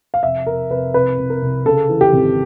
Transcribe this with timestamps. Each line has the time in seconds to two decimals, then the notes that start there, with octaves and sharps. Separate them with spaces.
0.14 F5
0.23 F1 E5
0.47 F1 A#4
0.70 F1 B4
0.94 C2 B4
1.18 C2
1.30 A#4
1.42 C2
1.66 C#3 A4
1.89 E3
2.01 G4
2.13 G#1